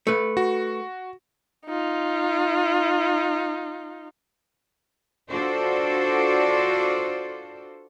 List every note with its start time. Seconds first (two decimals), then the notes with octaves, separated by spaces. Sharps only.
0.07 A3 B4
0.37 F#4
1.66 D#4 F4
5.30 D4 F4 F#4 A4 C5 D5